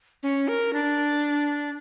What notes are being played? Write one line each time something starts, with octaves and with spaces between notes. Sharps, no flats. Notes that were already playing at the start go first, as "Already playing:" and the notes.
C#4
A#4
D4